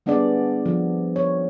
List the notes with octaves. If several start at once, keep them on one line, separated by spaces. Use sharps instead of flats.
G3 B3 D4 G#4 D5
F3
C#5